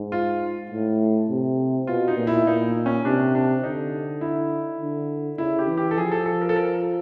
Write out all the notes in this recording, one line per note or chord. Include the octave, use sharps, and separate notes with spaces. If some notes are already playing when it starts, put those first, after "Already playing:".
Already playing: G#2
F4
A2
C3
B2 F4
D#4
A#2
E4
A#2 D#4
C#4
C3 D4
D4
D3 D#4
E4
D3
C#3 E4
G4
E3
G4
A4
F3 G#4
A4
A4
A#4
A4
A#4